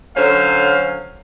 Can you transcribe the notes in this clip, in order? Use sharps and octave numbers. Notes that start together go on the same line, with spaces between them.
D3 F#3 C#4 C5 F5